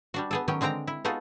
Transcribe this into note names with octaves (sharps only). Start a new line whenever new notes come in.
G3 D4 F#4
B3 G#4 A4
D#3 F#3 B3 C#4 G5
D3 G#3 C4 G5 A#5
E4
B3 D#4 F4 F#4 G#4 A4